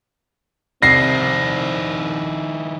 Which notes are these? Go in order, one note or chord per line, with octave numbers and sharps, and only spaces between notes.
C2 D#3 C4 E4 A#6 C7